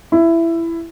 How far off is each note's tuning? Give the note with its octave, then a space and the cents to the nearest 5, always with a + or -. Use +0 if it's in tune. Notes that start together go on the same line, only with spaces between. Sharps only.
E4 +15